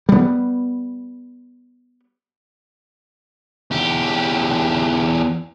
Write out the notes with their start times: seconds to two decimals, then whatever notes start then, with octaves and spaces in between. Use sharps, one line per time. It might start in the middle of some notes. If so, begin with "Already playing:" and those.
0.09 G3 B3
3.71 E2 G4